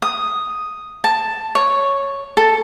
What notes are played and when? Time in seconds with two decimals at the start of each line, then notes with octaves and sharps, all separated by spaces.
0.02 D#6
1.04 A5
1.55 C#5
2.37 A4